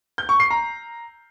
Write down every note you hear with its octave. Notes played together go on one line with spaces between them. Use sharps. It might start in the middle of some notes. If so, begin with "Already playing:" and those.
G6
C#6
C7
A#5